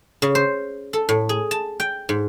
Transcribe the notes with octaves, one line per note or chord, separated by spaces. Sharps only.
C#3
C5
A4
A2
G#4
A5
G5
G#2